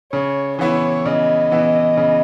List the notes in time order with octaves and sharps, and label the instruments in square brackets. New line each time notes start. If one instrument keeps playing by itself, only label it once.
[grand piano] C#3 [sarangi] C#5
[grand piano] E3 B3 E4 [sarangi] C#5
[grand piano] C#3 [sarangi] D#5
[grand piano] E3 B3 E4
C#3